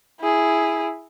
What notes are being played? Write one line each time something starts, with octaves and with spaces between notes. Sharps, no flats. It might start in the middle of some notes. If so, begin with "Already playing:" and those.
E4 G#4